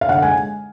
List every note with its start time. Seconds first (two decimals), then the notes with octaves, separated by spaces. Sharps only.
0.01 F5
0.08 D3 F#5
0.22 G#3 G#5